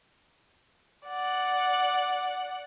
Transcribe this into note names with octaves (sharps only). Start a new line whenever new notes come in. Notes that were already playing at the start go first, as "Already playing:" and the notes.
D5 F#5